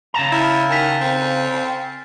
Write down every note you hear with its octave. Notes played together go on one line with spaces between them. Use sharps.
C#3 A5 A#5
E4 F6 A6
D#3 G#5 A6 B6
C4